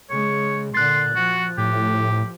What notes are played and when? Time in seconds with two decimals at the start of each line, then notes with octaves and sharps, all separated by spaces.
0.10 C#3 G#3 C#5
0.75 A#2 D3 C6 F#6 A6
1.16 F3 F#4
1.58 A2 G4